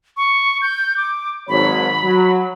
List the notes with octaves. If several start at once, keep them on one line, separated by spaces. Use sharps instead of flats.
C#6
G6
D6
G#1 F#3 C#5 B5
F#3